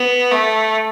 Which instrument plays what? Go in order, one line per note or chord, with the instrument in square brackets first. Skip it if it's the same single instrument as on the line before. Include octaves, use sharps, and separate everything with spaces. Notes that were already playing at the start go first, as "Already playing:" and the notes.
Already playing: [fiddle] B3
A3